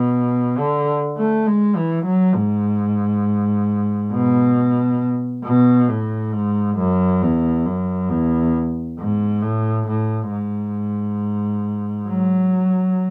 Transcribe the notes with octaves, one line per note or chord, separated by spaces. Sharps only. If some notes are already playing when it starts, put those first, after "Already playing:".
Already playing: B2
D3
A3
G#3
E3
F#3
G#2
B2
B2
A2
G#2
F#2
E2
F#2
E2
G#2
A2
A2
G#2
F#3